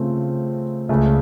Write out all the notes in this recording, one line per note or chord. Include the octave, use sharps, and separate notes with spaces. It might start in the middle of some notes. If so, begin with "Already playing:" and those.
Already playing: C#3 A3 C4 F4
C#2 C#3 A3